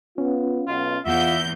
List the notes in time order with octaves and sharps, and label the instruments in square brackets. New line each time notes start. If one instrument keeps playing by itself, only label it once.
[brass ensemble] B3 F4 [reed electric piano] C#4
[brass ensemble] B1 B2 [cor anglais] F4
[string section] E2 G6 [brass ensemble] F4 F#5 [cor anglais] E5